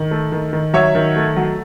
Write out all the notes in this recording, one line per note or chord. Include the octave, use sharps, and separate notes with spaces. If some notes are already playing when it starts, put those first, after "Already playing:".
Already playing: D#3
A3
D#3
D#3
F#3 C#5 E5
D#3
A3
F#3